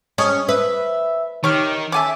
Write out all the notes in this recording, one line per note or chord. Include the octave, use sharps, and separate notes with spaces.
C#4 G#4 A4 D#5
B4 E5
D#3 G4 C#5 F6
C#4 A4 E5 G#5 D6